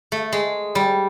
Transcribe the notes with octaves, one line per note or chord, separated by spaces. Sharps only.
A3
G#3
G3